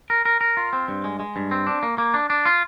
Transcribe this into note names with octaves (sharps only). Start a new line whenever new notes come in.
A#4
A#4
A#4
F4
C4
G2
G#3
G#3
G2
C4
D4
A#3
A#3
D4
D4
F4